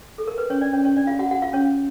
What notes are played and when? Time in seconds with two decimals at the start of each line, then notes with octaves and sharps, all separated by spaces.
0.18 A4
0.27 A#4
0.38 B4
0.50 C#4 C#5
0.61 D4 D5
0.73 C#4 C#5
0.84 C#4 C#5
0.96 D4 D5
1.07 F4 F5
1.19 F#4 F#5
1.31 F#4 F#5
1.42 F4 F5
1.53 C#4 C#5